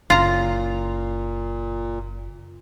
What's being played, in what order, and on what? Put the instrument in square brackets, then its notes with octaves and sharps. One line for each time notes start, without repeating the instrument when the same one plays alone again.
[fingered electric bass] F#1 C#3 [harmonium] A#2 [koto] F4 A#5